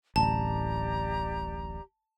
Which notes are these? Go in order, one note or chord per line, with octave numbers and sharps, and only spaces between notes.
D1 A1 G4 D5 A5 A#5